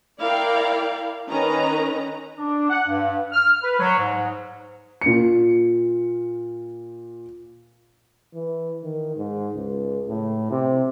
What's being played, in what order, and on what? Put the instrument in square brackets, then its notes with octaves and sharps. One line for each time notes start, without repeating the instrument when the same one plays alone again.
[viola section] E4 A#4 D5 F5 G5
D#3 C#4 B4 D#5 A#5
[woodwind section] D4
F#5
G2
F6
B4
F#3
G#2
[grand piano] A#2 C#7
[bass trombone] E3
D#3
G#2
C#2
A2
C3